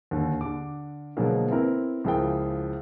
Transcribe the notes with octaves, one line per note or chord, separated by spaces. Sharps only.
D#2 D3
D3 D6
B2 D3 F3 F#3 G#3 A#3
B3 C4 E4 A#4
C#2 F3 E4 G#4 A#4 G5